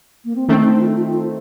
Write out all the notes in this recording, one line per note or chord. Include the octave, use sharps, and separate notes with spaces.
A#3
C4
D#3 A3 C4 C#4
D#4
D#4
F4
F4
F4